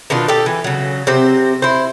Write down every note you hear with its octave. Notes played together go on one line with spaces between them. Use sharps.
B2 D#3 D4 F4
G4 A4
E3
C#3 F#3
C3 C4 C5
E4 C5